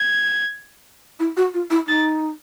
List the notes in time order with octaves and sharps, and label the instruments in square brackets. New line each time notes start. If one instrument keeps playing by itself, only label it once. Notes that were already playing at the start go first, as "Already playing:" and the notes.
Already playing: [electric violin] G#6
[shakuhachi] E4
F#4
F4
E4
[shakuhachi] D#4 [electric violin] A6